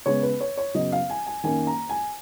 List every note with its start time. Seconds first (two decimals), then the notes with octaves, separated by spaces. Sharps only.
0.06 C#3 G#3 B3 C#5
0.23 B4
0.41 C#5
0.57 C#5
0.75 C#3 F#3 B3 D#5
0.92 F5
1.10 G#5
1.26 G#5
1.44 D#3 A#3 C#4 G#5
1.67 A#5
1.89 G#5